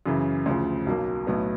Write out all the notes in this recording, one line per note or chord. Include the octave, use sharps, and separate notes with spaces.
F#2 C#3 E3
D2 C#3 F3
B1 B2 F#3 A#3
B1 A2 F#3 B3